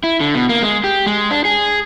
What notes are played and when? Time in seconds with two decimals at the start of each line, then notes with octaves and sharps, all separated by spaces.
0.04 E4
0.20 D3
0.35 B2
0.49 A#3
0.63 G#3
0.84 G4
1.06 G#3
1.31 D4
1.45 G#4